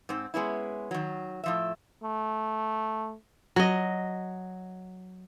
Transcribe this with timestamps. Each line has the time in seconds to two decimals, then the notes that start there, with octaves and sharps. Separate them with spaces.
0.09 G#2 C4
0.34 G#3 B3 C#4 E4
0.91 D#3 F#3
1.44 A2 F3 E5
2.03 A3
3.56 F#3 D#5